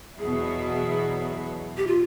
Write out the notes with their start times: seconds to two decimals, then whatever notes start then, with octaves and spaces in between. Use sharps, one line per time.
0.19 E2 B2 F#3 B3 E4 G#4
1.77 G4
1.87 F4